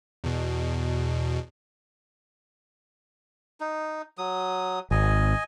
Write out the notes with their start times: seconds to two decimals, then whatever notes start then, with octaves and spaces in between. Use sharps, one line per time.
0.24 E2 B2
3.60 D#4
4.18 F#3 D#6
4.91 G#1 D#5 G#5